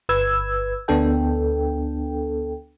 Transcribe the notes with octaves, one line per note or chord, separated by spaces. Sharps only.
G1 B4 E6 G#6
D2 B3 D4 A4 G5